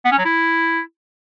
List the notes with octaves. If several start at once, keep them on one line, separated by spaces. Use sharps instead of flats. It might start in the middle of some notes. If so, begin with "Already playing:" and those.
B3
C#4
F#3
E4